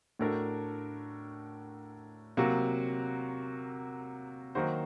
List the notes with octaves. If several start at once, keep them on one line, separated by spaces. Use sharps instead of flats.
A2 A3 D4 F#4 A#4
C3 F#3 A#3 F#4
D#3 F#3 A#3 F#4 C5